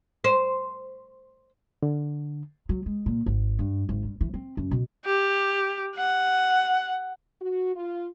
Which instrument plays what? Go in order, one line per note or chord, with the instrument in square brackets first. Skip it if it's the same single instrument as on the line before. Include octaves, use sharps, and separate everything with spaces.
[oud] C5
[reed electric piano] D3
[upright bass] F#3
G#3
A#2
G#1
G2
G#1
G2
E3
C4
F#2
B2
[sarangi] G4
F#5
[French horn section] F#4
F4